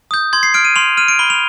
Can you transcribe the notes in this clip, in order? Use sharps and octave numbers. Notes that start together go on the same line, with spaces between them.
D#6 G6
C6 G#6
C7
F6 D7
D#7
C6 F7
F6 D#7
D7
B5 G7
F7